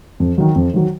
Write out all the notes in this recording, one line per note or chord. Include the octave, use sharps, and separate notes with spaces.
F2
D#3 F#3
F2
D#3 F#3